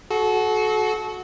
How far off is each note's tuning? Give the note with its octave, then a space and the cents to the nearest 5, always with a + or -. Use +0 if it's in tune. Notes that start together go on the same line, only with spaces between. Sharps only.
F#4 +0 A4 -35